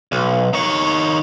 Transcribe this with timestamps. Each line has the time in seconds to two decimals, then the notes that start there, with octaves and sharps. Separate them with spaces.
0.12 B1
0.53 D#3 C#5